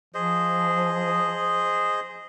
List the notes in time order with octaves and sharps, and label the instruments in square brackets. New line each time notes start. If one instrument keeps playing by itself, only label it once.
[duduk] F3 [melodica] G#4 C5 D#5